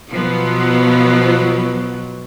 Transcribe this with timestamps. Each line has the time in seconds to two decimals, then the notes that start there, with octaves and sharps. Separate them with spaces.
0.11 B2 F3 F#3 B3